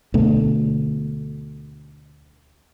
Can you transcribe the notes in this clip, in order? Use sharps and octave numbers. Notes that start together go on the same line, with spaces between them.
D2 B2 A3